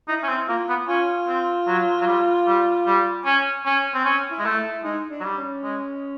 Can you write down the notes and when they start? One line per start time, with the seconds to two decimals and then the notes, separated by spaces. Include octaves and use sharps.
0.08 D#4 E4
0.23 C#4
0.28 C4
0.48 A#3 F4
0.69 B3
0.88 C#4 F4
1.28 C4
1.67 F#3
2.01 F#3
2.07 G3
2.47 G3
2.86 G3
3.25 C#4
3.66 C#4
3.94 C4
4.05 C#4
4.31 E4
4.39 G#3
4.45 A3
4.58 E4
4.84 G#3 D#4
5.11 D4
5.20 F#3
5.24 G3
5.37 C#4
5.63 G#3